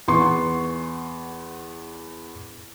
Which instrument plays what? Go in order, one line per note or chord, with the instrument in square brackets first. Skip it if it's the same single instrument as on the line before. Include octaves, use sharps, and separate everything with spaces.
[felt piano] E2 B3 C6 C#6